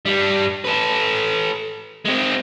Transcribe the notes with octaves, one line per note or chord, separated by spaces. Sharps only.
G2 G3
A4 B4
G#3 C4